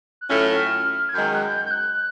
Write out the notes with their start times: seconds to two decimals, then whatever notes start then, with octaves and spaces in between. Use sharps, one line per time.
0.21 F#6
0.30 A2 F#3 A3 C#4 F4 F6
1.09 G#6
1.14 F#2 D#3 G#3 G6
1.35 F#6
1.43 G6
1.66 G6
1.71 F#6